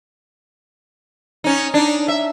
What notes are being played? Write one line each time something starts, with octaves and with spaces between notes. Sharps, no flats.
C#4 D#4
D4 D#4
E5